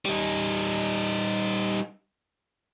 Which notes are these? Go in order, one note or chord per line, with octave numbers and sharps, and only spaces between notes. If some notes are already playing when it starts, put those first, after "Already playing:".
G3 D#4